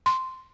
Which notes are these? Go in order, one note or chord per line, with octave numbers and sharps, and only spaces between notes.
C6